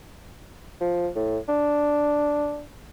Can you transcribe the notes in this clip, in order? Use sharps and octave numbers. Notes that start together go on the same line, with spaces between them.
F3
A2
D4